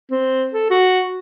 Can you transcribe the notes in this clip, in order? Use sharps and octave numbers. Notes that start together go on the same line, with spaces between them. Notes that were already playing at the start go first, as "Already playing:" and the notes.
C4
A4
F#4